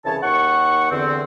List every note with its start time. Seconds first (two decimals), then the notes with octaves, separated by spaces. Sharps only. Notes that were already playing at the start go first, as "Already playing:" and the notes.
0.06 C2 C#3 E3 C#5 A5
0.23 D#2 F#5 C#6
0.91 E2 D3 C4